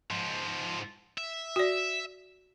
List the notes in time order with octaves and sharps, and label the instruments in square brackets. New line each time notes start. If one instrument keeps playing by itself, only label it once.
[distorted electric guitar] G#2 F3
E5
[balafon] F#4 D5